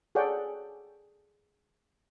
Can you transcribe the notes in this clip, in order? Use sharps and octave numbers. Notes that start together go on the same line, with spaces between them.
G#4 A4 C#5 D5 F#5 G5